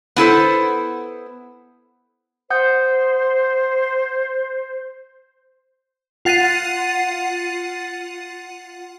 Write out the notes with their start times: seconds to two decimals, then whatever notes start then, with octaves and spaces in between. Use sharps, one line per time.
0.16 B3 E4 A4 C5
2.50 C5 F#5 D#6 G6
6.25 F4 F#5 A6 C7 D#7